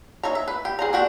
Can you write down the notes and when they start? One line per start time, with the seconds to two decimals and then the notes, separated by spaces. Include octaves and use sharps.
0.23 D#4 C#5 E5 A#5
0.35 E5
0.48 B4
0.65 G4
0.79 G#4 C5 A#5
0.93 D4 F#4 G4